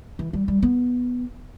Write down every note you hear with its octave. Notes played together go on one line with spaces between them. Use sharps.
E3
G3
G3
B3